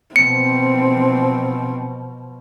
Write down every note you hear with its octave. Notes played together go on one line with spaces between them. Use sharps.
B2 F3 C4 C#7